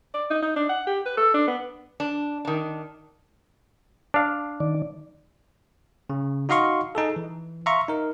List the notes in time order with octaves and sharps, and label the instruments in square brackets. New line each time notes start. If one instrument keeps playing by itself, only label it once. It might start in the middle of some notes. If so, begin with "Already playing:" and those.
[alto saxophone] D5
D#4
D#4
D4
F#5
G4
B4
A4
D4
B3
[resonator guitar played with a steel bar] D4
D#3 D4
[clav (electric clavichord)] D4 F5
[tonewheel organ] D#3 D5
[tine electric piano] C#3
D#4 F#4 D#5 F5 C6 C#6
D#4 G#4 A4
E3
E5 F5 A#5 C6 C#6
D#4 A#4